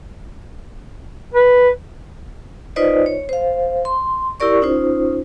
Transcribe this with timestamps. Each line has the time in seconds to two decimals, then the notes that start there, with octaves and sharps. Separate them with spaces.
1.34 B4
2.76 D#4 F4 B4 C5 D5 D#5
3.06 C#5
3.29 C5 F5
3.85 C6
4.40 E4 G4 A#4 D5 C#6
4.61 C#4 D#4 F4 C5